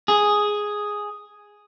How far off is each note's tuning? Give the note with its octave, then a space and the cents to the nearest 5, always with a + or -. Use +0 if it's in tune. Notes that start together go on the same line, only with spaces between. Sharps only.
G#4 +0